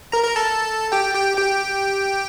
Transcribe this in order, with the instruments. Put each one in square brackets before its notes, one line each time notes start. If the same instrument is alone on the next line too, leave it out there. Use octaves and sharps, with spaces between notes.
[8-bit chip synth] A#4 A#5
A#4 A#5
A4 A5
G4 G5
G4 G5
G4 G5